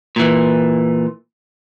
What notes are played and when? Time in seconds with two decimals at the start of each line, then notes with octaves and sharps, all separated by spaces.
0.16 A#2 E3